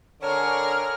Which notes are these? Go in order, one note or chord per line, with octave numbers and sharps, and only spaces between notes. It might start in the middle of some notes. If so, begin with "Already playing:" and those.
D3 G#4 A#4 C#5 F6